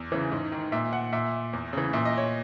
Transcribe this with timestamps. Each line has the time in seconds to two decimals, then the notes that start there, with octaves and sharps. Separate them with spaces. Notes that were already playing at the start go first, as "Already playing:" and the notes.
Already playing: E2
0.12 C#3 E3
0.32 G#2
0.52 D#3
0.72 A#2 E5
0.93 F#5
1.13 A#2 E5
1.53 E2
1.73 C#3 E3
1.93 A#2 E5
2.05 D#5
2.18 C#5